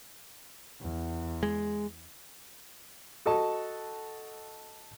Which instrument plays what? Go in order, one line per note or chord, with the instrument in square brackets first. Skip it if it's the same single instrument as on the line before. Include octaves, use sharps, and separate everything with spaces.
[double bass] E2
[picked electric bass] G#3
[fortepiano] F#4 A4 D#5 A5